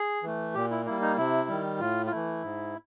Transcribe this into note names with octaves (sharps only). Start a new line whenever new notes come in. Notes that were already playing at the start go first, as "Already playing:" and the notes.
Already playing: G#4
E3 A3
A#2 G4
E4
G3 A#3 E4
D#4
C3 E4
D#3 G3
A2 F4
F4
E3 A3 E4
G#2